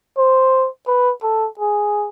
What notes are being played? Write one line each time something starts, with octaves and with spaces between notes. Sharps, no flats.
C5
B4
A4
G#4